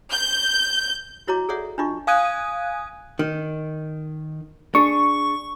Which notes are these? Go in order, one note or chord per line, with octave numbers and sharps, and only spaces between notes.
G6
E4 F#4 C#5 D#5 A#5 D6
G#4 A4 C#5 D5 E5 F#5
D4 D#4 F4 D#5 C#6
F5 G#5 D#6 F#6 G#6 D#7
D#3
D4 G#4 C#6